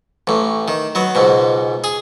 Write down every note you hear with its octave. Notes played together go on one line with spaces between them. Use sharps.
A1 A2
D#3
F#3 B3
C#2 G#2 B2
G#4